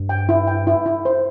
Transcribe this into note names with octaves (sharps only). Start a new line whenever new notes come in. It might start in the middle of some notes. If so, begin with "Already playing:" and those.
Already playing: G2
G5
E4
G5
E4
E4
C5